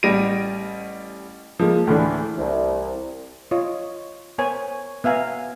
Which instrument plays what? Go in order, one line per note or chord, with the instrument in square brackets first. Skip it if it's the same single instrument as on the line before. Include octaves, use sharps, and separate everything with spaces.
[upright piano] A1 G3 A#6 D7 D#7
F3 G#3 A#3
D2 A2 E3 D4
[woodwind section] C2
[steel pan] F4 C#5 D#5
B3 A#4 C5 C#5 G#5
B3 E5 F5 G#5 A#5